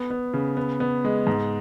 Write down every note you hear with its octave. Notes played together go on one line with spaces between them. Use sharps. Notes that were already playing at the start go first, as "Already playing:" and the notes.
Already playing: B3
B3
C#3
B3
B3
G#3
G#2